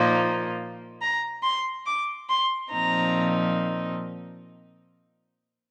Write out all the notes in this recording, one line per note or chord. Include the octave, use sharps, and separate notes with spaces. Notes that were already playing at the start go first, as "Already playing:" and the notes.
Already playing: A#2 F3 A#3 D#4
A#5
C6
D6
C6
A#2 F3 C4 D#4 A#5